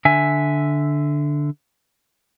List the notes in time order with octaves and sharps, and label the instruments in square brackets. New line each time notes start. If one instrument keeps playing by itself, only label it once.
[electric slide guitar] D3 E5 G#5